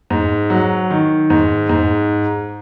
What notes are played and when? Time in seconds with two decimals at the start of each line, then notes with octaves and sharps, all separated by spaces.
0.10 G#2
0.50 F#3
0.90 D#3
1.30 G#2
1.69 G#2